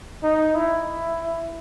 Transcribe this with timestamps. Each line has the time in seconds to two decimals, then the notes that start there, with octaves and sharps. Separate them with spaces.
0.24 D#4
0.55 E4